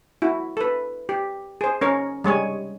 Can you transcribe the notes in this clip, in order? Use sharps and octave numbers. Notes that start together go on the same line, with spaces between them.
E4 F#4
A4 B4
G4
G#4 C5
C#4 A#4 C#5
G3 G#3 C#5 G#5